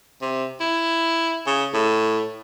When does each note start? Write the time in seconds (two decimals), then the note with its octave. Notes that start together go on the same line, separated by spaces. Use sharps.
0.21 C3
0.60 E4
1.47 C#3
1.73 A2